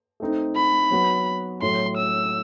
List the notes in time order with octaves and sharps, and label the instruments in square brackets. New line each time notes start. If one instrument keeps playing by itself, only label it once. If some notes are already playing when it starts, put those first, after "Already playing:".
[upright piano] A3 C4 D#4
[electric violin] B5
[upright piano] F#3 B3 F#4
[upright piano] A2 F#3 A3 [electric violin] C6
[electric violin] E6